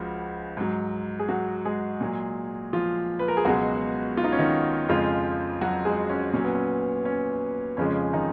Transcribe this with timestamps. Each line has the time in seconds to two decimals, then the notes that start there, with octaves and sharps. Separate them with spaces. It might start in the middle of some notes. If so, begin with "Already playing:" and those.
Already playing: C#2 C#3 F3 F#4
0.57 G#2 F#3
1.19 G#4
1.28 F#3 F#4
1.65 G#3 G#4
2.01 A#2 F#3
2.73 F3 F4
3.19 B4
3.28 A#4
3.37 G#4
3.45 C#2 B2 F#3 G#3 F#4
4.17 F4
4.24 D#4
4.32 C#4
4.39 D#3 D#4
4.89 F2 C#3 F3 G#3 F4
5.61 F#3 F#4
5.85 G#3 G#4
6.09 C#4
6.33 A#2 F#3 C#4
6.44 B3
6.55 C#4
7.05 C#4
7.77 F2 C#3 F3 G#3 C#4
8.13 D#3 D#4